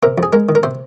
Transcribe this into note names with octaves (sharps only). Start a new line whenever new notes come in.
C3 A#4
F2
G#4
G#3 A#4
D#3
A#4
C3 C5